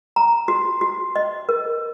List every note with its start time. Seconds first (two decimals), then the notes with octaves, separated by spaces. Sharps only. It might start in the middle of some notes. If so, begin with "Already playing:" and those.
0.16 A#5
0.48 F#4
0.81 F#4
1.16 D#5
1.49 A#4